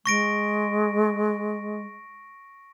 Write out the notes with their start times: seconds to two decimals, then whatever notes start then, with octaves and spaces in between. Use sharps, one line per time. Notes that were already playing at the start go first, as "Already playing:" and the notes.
0.06 G#3 C#6 A#6 D7